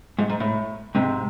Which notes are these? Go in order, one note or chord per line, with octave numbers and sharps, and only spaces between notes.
G#2
G#2
A2
G#2 C3